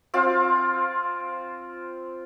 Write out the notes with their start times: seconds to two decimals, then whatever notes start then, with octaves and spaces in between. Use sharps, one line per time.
0.14 C4 F4 F5